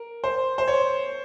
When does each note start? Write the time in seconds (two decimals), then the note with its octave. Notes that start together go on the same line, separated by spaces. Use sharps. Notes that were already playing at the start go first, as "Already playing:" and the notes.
Already playing: A#4
0.24 C5
0.58 C5
0.68 C#5